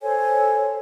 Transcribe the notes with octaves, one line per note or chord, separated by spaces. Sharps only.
A4 C5 C#5 G#5